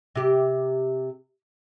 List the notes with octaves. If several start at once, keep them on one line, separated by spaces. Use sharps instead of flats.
C3 G4